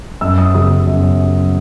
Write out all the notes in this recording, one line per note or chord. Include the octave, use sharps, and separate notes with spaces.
F#2 E6
D#6
C#3 F#3 B3 D#6
F#2